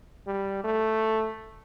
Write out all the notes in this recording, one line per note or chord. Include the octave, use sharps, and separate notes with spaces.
G3
A3